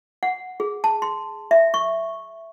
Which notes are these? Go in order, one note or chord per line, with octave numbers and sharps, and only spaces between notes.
F#5
G#4
A5
C6
E5
C#6